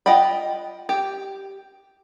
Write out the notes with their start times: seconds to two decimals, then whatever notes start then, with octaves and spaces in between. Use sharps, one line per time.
0.06 F4 D#5 F#5 G5 B5
0.89 G4